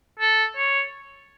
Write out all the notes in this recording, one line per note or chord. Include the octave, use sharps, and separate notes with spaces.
A4
C#5